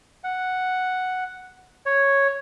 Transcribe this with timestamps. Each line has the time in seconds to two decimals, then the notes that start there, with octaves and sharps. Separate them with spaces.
0.24 F#5
1.86 C#5